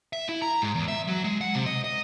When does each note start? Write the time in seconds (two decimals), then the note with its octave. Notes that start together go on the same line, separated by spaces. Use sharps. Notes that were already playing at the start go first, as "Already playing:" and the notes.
0.13 E5
0.29 E4
0.42 A#5
0.62 G#2
0.75 E2
0.88 E5
1.07 F#3
1.24 G#3
1.41 F#5
1.55 C3
1.66 D#5
1.84 D#5